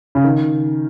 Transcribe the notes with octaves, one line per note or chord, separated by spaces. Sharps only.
C#3
D#3